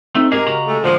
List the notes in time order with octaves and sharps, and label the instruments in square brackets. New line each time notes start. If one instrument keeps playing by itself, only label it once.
[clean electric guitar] A3 [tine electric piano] C4 D#4
[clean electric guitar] G#2 A#3 G#4 [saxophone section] G#3 A#4 [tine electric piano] G4 D#5
[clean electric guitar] C#3 F#4 A#5
[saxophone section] G#3 A3
[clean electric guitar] D2 A#2 G#3 [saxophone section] F3